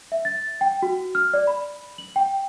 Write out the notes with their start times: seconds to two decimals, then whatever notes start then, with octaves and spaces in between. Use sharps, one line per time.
0.12 E5
0.25 A6
0.61 G5
0.82 F#4
1.15 F6
1.34 D5
1.47 B5
1.98 F#7
2.16 G5